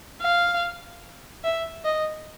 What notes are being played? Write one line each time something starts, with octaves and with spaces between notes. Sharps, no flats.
F5
E5
D#5